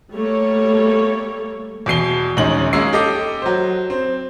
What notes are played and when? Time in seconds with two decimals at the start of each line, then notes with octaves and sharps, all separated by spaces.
0.12 G3 A3 A#3 A4 C#5
1.86 E2 B2 C7 G7
2.37 A#1 D#2 G#3 C#4 D#4 F#7
2.73 G#3 A#3 C#4 E6 C7
2.93 G4 A4 D#5 D6
3.42 F#3 C5
3.90 C4